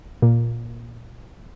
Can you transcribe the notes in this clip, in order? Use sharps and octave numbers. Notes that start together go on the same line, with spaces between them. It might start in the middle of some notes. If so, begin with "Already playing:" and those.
A#2